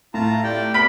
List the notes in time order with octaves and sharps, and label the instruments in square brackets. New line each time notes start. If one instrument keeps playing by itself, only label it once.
[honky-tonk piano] A2 [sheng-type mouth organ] F4 A5 A#5
[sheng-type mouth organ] G4 D5 G5
[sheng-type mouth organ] B3 [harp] B5 [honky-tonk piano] F6 D7 F#7